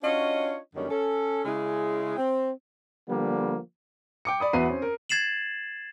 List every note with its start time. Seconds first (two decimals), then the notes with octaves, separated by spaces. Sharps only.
0.03 C#4 D4 F4 F#4 C#5 D#5
0.75 F#2 D3 D#3 G3 A#3 C#4
0.89 C#4 A4
1.44 C#3 G#3 E4
2.17 C4
3.08 D3 F3 G3 A#3 B3
4.25 G5 D6 C#7
4.40 D5 B5 D#6
4.53 E2 F#4 B4 E5 C7 D#7
4.69 C4 C#4
4.82 A#4
5.09 G#6 A6 C7 E7 F#7